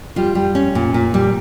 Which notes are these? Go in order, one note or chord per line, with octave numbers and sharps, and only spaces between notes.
G3 F4
G3
C#4
A#2
A#2
G3